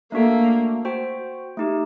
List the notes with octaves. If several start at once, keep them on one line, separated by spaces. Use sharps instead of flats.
A3 A#3 D4 F#4 A4
F#4 C5 G5
A3 D#4 G4